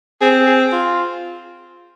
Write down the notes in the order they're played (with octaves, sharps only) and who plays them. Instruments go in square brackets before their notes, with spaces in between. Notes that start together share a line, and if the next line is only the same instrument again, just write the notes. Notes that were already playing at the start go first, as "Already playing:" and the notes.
[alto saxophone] C4 [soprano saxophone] G#4
[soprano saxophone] G#4
F4